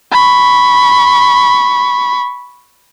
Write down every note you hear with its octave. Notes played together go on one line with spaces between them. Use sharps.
B5 C#6